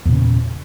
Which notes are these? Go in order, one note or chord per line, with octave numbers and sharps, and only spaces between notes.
E2 A#2 C#3